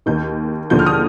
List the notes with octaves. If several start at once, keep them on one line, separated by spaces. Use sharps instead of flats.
D#2 D#3 G6
D#2 D3 F3 G6
F6
D#6